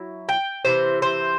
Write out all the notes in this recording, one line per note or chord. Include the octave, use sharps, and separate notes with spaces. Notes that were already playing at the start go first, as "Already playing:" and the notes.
Already playing: F#3 E4
G5
C3 E3 C5
C5